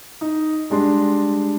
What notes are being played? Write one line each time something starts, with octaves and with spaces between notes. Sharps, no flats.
D#4
G3 G#3 D4 C6